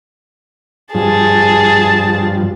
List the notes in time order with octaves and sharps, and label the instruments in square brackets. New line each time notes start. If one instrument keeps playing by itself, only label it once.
[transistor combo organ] G2 F3 [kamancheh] G#4 A5